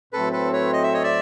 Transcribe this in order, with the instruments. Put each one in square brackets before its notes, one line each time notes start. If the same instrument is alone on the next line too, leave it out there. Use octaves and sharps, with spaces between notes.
[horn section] A2 F#3 A3 C4 [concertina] A4 B4
[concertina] A4 B4
B4 C#5
D#5
E5
C#5 D#5
D5 E5